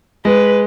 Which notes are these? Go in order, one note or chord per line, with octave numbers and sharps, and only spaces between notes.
G#3 B4